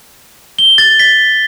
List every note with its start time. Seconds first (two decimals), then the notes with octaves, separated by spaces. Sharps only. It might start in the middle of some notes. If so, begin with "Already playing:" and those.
0.59 G7
0.78 A6
1.00 B6